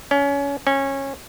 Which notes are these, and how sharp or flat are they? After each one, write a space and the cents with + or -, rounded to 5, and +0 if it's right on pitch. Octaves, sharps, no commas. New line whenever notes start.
C#4 +25
C#4 -20